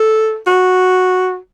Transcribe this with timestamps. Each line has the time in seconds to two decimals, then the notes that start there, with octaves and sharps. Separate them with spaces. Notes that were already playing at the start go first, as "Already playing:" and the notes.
Already playing: A4
0.47 F#4